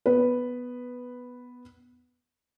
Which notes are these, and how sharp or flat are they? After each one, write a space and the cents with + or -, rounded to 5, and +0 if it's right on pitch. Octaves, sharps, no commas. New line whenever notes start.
B3 +0 B4 +0